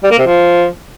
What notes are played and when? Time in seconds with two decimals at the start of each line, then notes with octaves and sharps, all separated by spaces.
0.04 G3
0.11 A#3
0.19 C3
0.26 F3